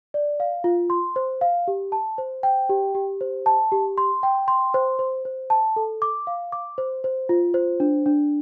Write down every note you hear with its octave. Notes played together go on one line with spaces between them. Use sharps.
D5
F5
F4
C6
C5
F5
G4
A5
C5
G5
G4
G4
C5
A5
G4
C6
G5
C6
C5
C5
C5
A5
A4
D6
F5
D6
C5
C5
F4
C5
D4
D4